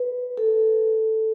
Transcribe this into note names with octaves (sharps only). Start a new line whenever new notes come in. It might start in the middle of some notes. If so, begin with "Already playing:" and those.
Already playing: B4
A4